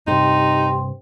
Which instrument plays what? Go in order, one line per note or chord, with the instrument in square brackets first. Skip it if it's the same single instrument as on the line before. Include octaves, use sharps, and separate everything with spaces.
[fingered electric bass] G2 C3 [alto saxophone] D#4 [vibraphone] G4 G5 C6